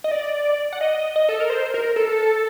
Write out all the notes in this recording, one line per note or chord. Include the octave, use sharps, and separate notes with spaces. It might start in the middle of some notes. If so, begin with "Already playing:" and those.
D#5
D5
F#5
D#5
D#5
A4
A#4
C5
A#4
A4